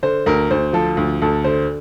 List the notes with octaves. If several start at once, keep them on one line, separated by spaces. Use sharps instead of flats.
D3 C5
D2 A#4
D2 C5
F3 A4
D2
D2 A4
D3 C5